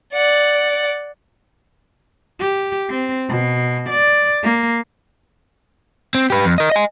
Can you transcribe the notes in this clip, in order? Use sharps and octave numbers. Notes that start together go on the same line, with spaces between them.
D5 F#5
G4
C4
B2
D5
A#3
C4
G4 B4
F2
A#4 D#5
D#5 G#5